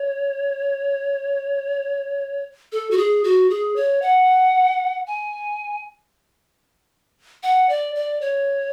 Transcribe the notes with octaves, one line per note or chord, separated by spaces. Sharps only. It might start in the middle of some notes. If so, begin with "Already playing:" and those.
Already playing: C#5
A4
F#4
G#4
F#4
G#4
C#5
F#5
G#5
F#5
D5
D5
C#5